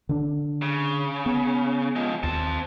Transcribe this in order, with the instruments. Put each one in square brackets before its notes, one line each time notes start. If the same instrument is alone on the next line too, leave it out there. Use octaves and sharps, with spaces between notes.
[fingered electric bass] D3 D4
[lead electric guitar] C#3
[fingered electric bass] B3
[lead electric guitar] F3 G#3
[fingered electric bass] D#2 [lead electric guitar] C4 A5